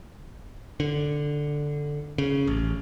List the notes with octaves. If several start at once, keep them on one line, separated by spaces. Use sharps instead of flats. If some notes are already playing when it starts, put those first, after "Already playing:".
D3
C#3
A1